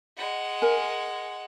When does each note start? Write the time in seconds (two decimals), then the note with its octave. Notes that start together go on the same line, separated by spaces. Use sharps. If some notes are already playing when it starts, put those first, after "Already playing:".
0.17 G#3 F#5
0.62 A#4 G#5